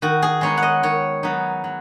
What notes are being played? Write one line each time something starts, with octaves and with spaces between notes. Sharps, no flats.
D#3 F#4
G#4
G#3 B3 D#4 C#5
F#5
D#5
D#3 C#5
F#3 B3 D#4
F#3